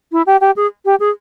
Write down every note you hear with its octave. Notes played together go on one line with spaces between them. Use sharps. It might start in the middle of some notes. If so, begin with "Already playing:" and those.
E4
G4
G4
G#4
G4
G#4